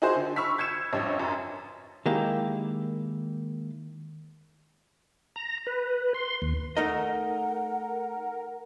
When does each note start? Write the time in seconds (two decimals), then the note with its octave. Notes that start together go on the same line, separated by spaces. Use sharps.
0.02 D#4 E4 F#4 G#4 C5
0.15 D3
0.36 B5 C#6 E6 F6 B6
0.58 G6 G#6 C#7 E7
0.93 A1 F2 G3 D4 C#5 D#5
1.20 F#2
2.06 D#3 G#3 A#3 E4 G4
5.36 A#5
5.67 B4
6.14 C6
6.42 D#2
6.77 A3 D#4 A#4 D#5 F#5